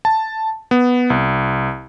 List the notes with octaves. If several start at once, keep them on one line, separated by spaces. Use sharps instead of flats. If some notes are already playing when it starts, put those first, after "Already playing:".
A5
B3
C2